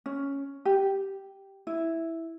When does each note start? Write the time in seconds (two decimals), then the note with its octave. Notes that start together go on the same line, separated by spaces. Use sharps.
0.06 C#4
0.65 G4
1.67 E4